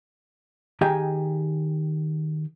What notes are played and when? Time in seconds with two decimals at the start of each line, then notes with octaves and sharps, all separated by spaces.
0.81 D#3 G4 G#4 D#5 G5 G#5